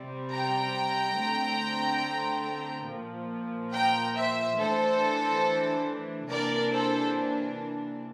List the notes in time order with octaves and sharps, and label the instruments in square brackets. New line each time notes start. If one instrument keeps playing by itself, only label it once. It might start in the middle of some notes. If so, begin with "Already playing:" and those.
Already playing: [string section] C3 G3 C4
G5 A#5
D3 A3 C4
A#2 F3 A#3
G5 A#5
C5 E5
E3 A3 D4 A4 C5
C3 E3 A#3 D4 A#4 D5
A4 C5